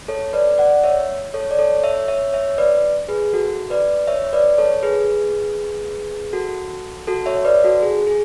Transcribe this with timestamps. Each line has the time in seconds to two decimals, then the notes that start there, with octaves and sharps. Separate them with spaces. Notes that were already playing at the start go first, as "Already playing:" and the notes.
0.08 A4 C#5
0.33 B4 D5
0.58 D5 F#5
0.84 C#5 E5
1.34 A4 C#5
1.51 D5
1.58 A4 C#5
1.83 C#5 E5
2.08 C#5 E5
2.33 C#5 E5
2.58 B4 D5
3.08 G#4 B4
3.33 F#4 A4
3.70 B4 D5
4.07 C#5 E5
4.33 B4 D5
4.58 A4 C#5
4.83 G#4 B4
6.33 F#4 A4
7.07 F#4 A4
7.26 C#5 E5
7.37 E5
7.45 B4 D5
7.64 F#4 A4
7.83 G#4
8.07 G#4